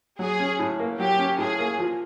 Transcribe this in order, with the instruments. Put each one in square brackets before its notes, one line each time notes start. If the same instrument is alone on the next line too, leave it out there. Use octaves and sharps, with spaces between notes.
[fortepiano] F#3 [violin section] G#4
[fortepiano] C#4
A2
A#3
[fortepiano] F#3 [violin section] G4
[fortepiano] C#4
[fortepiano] A2 [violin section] G#4
[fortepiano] A#3
F3